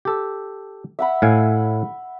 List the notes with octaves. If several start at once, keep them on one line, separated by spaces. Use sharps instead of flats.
G4 A4
E5 F#5 B5
A2 F5 G#5